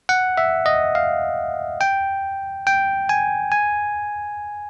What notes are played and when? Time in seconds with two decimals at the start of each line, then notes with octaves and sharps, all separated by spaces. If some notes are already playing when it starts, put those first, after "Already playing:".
0.09 F#5
0.38 E5
0.66 D#5
0.95 F5
1.81 G5
2.67 G5
3.09 G#5
3.52 G#5